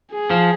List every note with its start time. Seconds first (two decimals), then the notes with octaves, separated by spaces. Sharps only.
0.12 G#4
0.30 F3